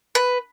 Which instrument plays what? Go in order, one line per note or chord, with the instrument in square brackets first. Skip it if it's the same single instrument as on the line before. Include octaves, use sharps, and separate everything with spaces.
[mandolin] B4